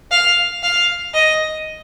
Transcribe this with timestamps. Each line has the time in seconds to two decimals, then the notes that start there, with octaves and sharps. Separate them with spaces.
0.10 F5
0.63 F5
1.14 D#5